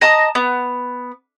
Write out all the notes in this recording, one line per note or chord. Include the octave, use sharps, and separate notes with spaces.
D#5 A5 A#5 D#6
B3